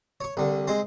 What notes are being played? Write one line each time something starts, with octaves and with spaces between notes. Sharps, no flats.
C#5 C#6
C2 D3
G#3 C4